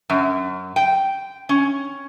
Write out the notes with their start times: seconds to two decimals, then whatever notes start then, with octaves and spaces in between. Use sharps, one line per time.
0.10 F#2
0.76 G5
1.49 C#4